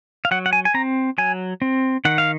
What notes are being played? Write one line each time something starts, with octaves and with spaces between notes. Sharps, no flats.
F5
F#3 F#5
F#5
G#5
G#5
C4 A#5
F#3 G#5
C4
D#3 F#5
F5